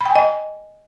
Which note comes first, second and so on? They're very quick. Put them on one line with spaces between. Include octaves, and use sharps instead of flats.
B5 G5 G#5 D#5